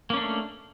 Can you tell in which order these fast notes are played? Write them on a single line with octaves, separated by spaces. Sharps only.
A#3 C#4 D4 A3